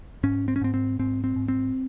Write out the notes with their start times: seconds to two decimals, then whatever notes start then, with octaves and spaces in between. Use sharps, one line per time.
0.23 G#2 C#4
0.48 C4
0.56 C#4
0.61 G#2 C4
0.74 C4
0.99 G#2 C4
1.24 C4
1.36 G#2
1.48 C4